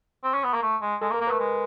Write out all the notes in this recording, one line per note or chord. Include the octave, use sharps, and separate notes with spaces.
C4
C#4
B3
A#3
A3
G#3
G#3 A4
A#3
A#4
A#3
B4
A3
G#3